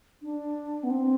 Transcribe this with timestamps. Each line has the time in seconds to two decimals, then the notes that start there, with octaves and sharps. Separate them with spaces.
0.22 D4
0.83 B3
0.90 C4